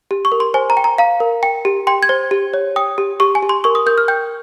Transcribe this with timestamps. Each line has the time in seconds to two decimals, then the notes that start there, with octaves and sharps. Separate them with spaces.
0.11 G4
0.25 C#6
0.32 A#4
0.40 C6
0.54 C5 G#5
0.70 A#5
0.77 G5
0.84 A#5
0.98 F5 A#5
1.20 A#4
1.43 G5
1.65 G4
1.87 G5 C6
2.03 G#6
2.09 C5
2.31 G4
2.54 C#5
2.76 G5 D#6
2.98 G4
3.20 G4 C#6
3.35 G#5
3.43 G4
3.49 C6
3.64 A#4 C#6
3.75 D#6
3.86 A#4 G6
3.98 F6
4.08 G5 G6